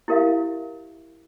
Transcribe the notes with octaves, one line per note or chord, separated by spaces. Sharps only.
E4 G4 A#4 E5 F5